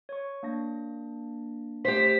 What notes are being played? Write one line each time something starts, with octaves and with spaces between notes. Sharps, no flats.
C#5 C#6
A#3 D4 A#6
A3 G4 C5 B6